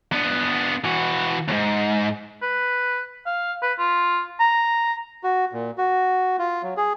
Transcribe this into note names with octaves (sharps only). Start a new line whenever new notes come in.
B3 D4
E3 F#4
D#2 G#2
B4
F5
B4
F4
A#5
F#4
A#2
F#4
F4
F#3
G#4